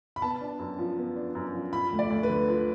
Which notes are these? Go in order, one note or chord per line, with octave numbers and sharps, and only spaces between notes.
B5
B3 A5
D4
F#2
F3
B3
D4
F#2
F3
F3 B5
D2
D5
D2
B4
D3
F3